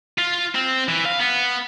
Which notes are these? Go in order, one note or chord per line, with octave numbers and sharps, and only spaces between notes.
F4
C4
E3
F5
B3